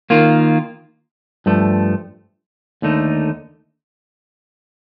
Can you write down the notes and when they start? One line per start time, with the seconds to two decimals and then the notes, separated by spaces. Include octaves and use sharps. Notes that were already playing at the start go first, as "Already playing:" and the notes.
0.10 D#3 A#3 F4
1.46 G2 F3 A3
2.82 D#2 D3 A3 D#4